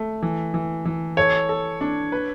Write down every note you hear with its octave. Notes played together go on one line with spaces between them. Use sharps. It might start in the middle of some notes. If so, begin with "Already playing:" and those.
Already playing: A3
E3
E3
E3
A4 C#5
A4
D4
B4